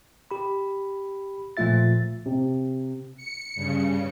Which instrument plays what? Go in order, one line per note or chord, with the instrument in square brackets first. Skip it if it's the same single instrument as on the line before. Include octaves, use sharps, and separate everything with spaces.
[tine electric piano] G4 B5
A#2 F3 A3 F4 E5 A6
[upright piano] C3
[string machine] C#7
G2 C#3